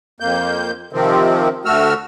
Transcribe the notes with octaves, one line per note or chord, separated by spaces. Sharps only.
F2 A#3 G6
C3 D#3 F3 C4
D2 A3 F#4 E6 F6